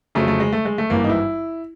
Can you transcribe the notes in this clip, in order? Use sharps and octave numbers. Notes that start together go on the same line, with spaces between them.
F2 C#3 F#3 A3
A3
G#3
A3
G#3
A3
G#1 G2 E3 A#3
D#4
E4